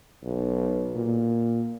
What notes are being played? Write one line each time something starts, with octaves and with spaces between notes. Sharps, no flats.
B1
A#2